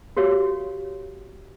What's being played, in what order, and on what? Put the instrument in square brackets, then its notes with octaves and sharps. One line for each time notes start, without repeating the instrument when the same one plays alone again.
[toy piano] F#4 G4 C#5 F5